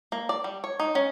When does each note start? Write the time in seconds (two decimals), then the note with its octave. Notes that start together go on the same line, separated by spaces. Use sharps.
0.12 A#3
0.29 D5
0.44 G3
0.64 C#5
0.80 D#4
0.95 C#4